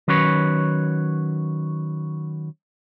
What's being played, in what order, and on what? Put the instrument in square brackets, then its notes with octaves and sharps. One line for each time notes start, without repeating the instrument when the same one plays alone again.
[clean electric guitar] D#3 F#3 C#4 B4 C#5